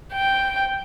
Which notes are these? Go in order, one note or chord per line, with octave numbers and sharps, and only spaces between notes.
G5